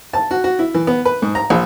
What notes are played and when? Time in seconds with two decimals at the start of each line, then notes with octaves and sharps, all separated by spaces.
0.13 A5
0.31 F#4
0.44 F#4
0.59 E4
0.74 E3
0.87 B3
1.05 B4
1.22 G#2
1.35 A#5
1.50 A#1